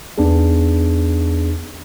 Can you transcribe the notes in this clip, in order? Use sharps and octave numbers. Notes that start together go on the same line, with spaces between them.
E2 B3 D4 D#4 G#4